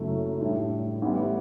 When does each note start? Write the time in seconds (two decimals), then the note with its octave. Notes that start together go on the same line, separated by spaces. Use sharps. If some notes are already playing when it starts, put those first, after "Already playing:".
Already playing: F#1 F#2 F#3 A3 E4
0.41 A2 G3 D4
1.02 A1 A2 G3 B3 E4